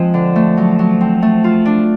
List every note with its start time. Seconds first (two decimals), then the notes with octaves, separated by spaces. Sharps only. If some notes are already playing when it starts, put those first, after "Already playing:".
Already playing: F3 G#3 C4
0.14 D3
0.36 A3
0.57 F#3
0.79 F#3
1.01 C4
1.22 A3
1.44 F4
1.65 D4